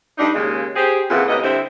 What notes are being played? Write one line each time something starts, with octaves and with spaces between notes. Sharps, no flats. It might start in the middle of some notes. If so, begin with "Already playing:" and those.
G2 A3 D4 D#4
D#2 C#3 G#3
G4 G#4 C5
F2 A#2 C#3 E3 F#5
A2 C3 A#3 B3 D#5
D3 G3 C4 E4 C5 E5